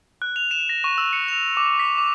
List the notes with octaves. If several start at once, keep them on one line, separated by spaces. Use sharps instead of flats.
F#6
F7
E7
A#6
C#6
E6
C#7
F7
D6
B6
D6